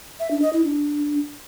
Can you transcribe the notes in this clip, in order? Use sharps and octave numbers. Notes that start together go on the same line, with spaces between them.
E5
D4
D#5
E4
D4